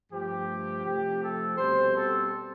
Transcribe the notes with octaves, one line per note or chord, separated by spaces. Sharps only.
G2 F3 A3 G4
C3 F3 A3 C4 G4
A4
B2 G3 C4 C5
A4